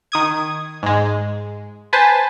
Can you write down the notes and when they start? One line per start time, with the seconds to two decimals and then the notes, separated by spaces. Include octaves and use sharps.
0.12 D#3 D#6 G#6
0.83 G#2 G#3
1.93 B4 C5 G#5 A5